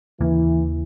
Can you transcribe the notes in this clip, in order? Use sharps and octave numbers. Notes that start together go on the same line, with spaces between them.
D#2 C#3 E3 A#3